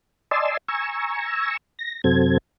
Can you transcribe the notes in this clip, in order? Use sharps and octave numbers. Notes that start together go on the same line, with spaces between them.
D5 D#5 G#5 A5 C6 E6
G#5 A#5 C#6 E6
A#6
F#2 C3 F#3 C4 A4 G#6